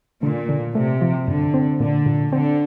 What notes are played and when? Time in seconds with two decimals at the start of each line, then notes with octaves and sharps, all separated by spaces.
0.23 A#2 D3
0.49 D3
0.75 C3 A3
1.01 F3
1.28 G2 D3
1.54 C4
1.80 A#2 D3
2.06 A#2
2.33 D3 C4